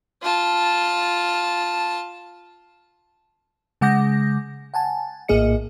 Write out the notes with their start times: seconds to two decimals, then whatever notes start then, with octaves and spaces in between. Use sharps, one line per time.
0.23 F4 A5
3.81 C#3 G#3 F#5 D6 G6 A#6
4.74 F#5 G#5 A5
5.28 A#1 A2 A#3 G#4 D#5 C#7